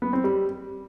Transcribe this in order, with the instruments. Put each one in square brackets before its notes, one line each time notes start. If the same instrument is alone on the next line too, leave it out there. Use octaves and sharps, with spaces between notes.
[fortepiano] B3
C4
G3